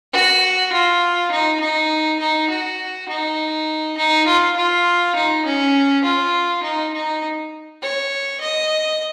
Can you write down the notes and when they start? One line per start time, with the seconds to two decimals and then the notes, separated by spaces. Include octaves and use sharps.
0.13 F#4
0.72 F4
1.31 D#4
1.60 D#4
2.19 D#4
2.50 F#4
3.09 D#4
3.97 D#4
4.27 F4
4.56 F4
5.15 D#4
5.45 C#4
6.04 F4
6.63 D#4
6.93 D#4
7.82 C#5
8.40 D#5